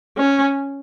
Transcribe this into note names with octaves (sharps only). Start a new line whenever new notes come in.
C#4